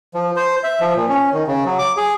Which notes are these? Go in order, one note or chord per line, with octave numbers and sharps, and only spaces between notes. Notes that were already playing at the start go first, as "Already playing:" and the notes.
F3
C5
E5
F3
A#2
C#4
D#3
C#3
F#3
D6
G#4